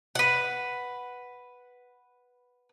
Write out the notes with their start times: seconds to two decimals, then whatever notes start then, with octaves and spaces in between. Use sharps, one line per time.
0.15 B4 F#5